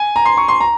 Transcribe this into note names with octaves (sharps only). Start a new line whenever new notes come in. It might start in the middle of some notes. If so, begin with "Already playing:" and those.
Already playing: G#5
A#5
C6
C#6
C6
A#5